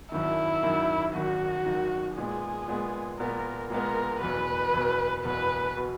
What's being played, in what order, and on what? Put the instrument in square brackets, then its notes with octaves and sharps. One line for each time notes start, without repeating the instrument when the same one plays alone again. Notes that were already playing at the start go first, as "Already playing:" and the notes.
[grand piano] G#1 F#2 D#3 [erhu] E4
[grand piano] G#1 F#2 D#3
[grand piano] G#1 F#2 D#3 [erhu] F#4
[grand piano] G#1 F#2 D#3
[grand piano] A#2 G#3 B3 [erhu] G#4
[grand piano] A#2 G#3 B3
[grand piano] A#2 G#3 B3 [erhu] A#4
[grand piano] A#2 G#3 B3 [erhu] A#4
[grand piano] F#1 E2 B2 [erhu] B4
[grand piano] F#1 E2 B2
[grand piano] F#1 E2 B2 [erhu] B4
[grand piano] B2